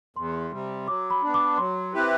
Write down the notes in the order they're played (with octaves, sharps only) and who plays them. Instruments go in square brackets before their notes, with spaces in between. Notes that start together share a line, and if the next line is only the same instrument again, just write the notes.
[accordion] E2 [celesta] C6
[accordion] C3 G3
[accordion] F#3 [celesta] D6
[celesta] B5
[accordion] B3 D4
[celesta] D6
[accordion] F#3 [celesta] C6
[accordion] C4 E4 G4 B4